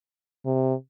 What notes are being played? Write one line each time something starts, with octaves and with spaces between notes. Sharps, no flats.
C3